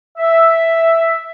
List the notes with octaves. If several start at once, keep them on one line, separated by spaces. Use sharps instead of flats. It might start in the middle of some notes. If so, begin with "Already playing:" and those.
E5